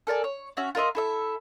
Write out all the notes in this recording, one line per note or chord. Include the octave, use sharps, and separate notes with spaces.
A4 A#4 D5 G#5
C#5
C#4 F#4 E5
F4 A#4 D#5 E5
E4 A4 E5